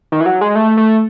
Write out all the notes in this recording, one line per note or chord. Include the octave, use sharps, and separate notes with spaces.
D#3
E3
F#3
G#3
A3
A3